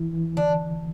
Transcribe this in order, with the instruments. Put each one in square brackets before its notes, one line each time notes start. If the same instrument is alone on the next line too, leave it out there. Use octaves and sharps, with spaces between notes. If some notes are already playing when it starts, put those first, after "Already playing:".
Already playing: [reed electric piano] E3 E4
E3
[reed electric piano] D3 [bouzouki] D4